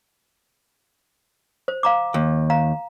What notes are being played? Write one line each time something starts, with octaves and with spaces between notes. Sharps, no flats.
C5
F5 A#5 D6
D#2
F5 A#5